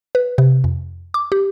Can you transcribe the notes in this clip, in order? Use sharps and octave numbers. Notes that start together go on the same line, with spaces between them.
B4
C3
F2
D6
G4